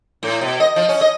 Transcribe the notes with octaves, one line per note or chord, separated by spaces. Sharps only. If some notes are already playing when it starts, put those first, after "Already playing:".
A2
B2
D#5
F3
C#4
D#5